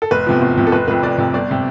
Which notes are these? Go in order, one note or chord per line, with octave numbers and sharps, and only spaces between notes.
A4
F1 B4
E2 C3 F3
F1
E2 C3 F3
A4
F1 B4
F2 C3 B4
F1 D5
F2 C3
G1 D5
C3